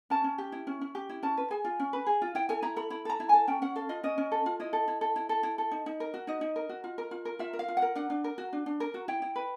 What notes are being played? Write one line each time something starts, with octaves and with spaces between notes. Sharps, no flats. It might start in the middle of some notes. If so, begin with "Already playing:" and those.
C#4 A5
C#4
G4
E4
C#4
C#4
G4
E4
C#4 A5
B4
G#4 G#5
F4
C#4
B4
G#4
F4
E4 G5
A4 G#5
E4 A#5
A4 B5
E4 B5
A4 A#5
E4
A4 G#5
C#4 G5
C#4 F#5
A4 F5
F4 D#5
C#4 D#5
C#4
A4
F4
E4 D#5
A4
E4
A4
E4
A4
E4
A4
D#4
D#4
A#4
F#4
D#4 D#5
D#4
A#4
F#4
F4
A#4
F4
A#4
F4 E5
A#4
F5
F4
F#5
A#4
D4 F#5
D4
A#4
F#4
D4
D4
A#4
F#4
E4 G5
E4
B4